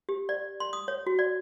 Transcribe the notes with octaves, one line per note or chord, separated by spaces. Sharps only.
G4
D5
C6
D#6
C#5
F#4
D5